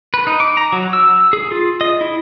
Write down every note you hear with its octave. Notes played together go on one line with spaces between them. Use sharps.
B4
D#4
D6
A#5
F#3
E6
G#4
F4
D#5
E4